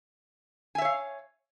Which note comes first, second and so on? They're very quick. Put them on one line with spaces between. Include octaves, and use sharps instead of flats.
G#5 E5 C#5 F5